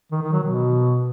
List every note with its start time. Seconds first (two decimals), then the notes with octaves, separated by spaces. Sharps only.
0.12 D#3
0.22 D#3
0.32 F#3
0.43 B2